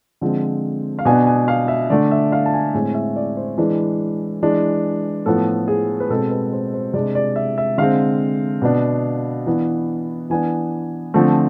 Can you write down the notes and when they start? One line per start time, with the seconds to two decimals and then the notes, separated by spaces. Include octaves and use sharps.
0.21 D3 F3 G#3 C4
0.99 F5
1.05 B2 B3 D4 G#5
1.27 G#5
1.48 F5
1.68 E5
1.90 D3 A3 D4 D5
2.11 E5
2.32 F5
2.46 A5
2.53 G#5
2.73 A2 G#3 C4 G#5
2.94 E5
3.16 D5
3.37 C5
3.58 E3 G#3 D4 B4
4.43 E3 G#3 D4
5.26 A2 F3 B3 A4
5.68 G#4
6.00 B4
6.10 B2 G#3 C4 A4
6.31 B4
6.53 C5
6.74 C5
6.94 C3 G#3 D4 D5
7.15 D5
7.36 E5
7.58 E5
7.78 D3 G#3 C4 F5
8.62 B2 B3 D4
9.47 E3 B3 D4
10.30 E3 B3 D4 G#5
11.14 D3 F3 A3 C4